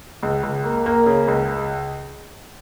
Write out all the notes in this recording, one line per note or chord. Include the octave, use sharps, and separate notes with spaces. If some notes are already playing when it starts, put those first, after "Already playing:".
C#2
C#2
A#3
A#3
C#3
C#2